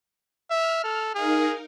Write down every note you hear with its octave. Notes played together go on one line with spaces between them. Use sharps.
E5 F6
A4
D#4 G#4 A#4 F5